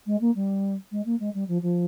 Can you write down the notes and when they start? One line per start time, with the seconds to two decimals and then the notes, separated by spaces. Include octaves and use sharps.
0.06 G#3
0.21 A#3
0.35 G3
0.91 G#3
1.05 A#3
1.19 G#3
1.34 G3
1.48 F3
1.62 F3